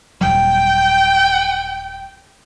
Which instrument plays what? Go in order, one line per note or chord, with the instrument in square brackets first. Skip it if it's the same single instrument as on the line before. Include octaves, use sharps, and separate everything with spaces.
[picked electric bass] D#1 G#1 F#3 [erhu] G5